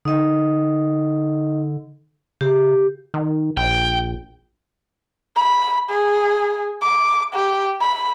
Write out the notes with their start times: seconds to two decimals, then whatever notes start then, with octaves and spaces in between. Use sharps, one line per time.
0.05 D3 D#4 D#5
2.41 C#3 G4
3.14 D#3
3.57 A#1 G5
5.36 B5
5.90 G#4
6.82 D6
7.34 G4
7.81 B5